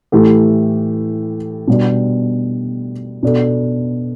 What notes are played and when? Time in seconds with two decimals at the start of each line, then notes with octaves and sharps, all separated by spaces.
0.12 A2 E3 A3 G4
1.68 B2 G3 D4
3.23 B2 B3 D4 A4